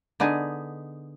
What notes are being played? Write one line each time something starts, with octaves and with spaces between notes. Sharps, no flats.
D3 B3 D#4 G#4